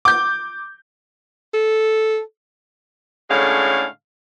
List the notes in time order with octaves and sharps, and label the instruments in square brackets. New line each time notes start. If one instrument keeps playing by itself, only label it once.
[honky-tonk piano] D6 G6
[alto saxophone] A4
[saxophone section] A2 D3 G#3 C#4 F5